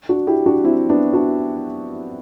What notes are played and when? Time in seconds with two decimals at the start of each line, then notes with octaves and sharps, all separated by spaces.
0.09 D4 F#4
0.27 E4 G4
0.46 D4 F#4
0.64 C4 E4
0.89 B3 D4
1.13 D4 F#4